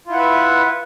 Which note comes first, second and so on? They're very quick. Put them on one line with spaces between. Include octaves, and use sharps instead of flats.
F4 E4 F#5 B4 E5